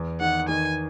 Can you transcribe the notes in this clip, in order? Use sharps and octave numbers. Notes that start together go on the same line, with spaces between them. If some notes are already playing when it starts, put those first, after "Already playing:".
Already playing: E2 E3
D#3 F#5
D#3 G#5